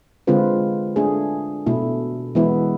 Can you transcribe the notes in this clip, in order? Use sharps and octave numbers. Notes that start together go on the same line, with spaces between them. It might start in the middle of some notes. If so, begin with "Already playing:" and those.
D3 G#3 C4 F4 B4
A3 D4 G#4
B2 A3 E4
E3 G#3 B3 E4